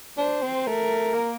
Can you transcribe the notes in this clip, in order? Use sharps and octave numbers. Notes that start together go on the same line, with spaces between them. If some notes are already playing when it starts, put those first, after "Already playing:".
D4 C5
C4
A3 A#4
A#3